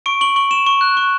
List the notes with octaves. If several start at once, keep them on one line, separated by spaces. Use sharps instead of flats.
C#6 D7
C#6 F#7
C#6 F#7
C#6 E7
C#6
F#6
C#6